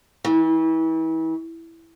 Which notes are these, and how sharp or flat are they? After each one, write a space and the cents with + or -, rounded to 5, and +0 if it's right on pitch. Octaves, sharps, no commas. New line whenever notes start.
E3 -35